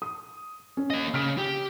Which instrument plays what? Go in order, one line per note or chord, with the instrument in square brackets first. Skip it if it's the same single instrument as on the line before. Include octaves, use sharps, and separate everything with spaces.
[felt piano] D#6
C#4
[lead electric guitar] A#3 D#5
[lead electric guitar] C#3 [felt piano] F6 B6 D7
[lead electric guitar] G4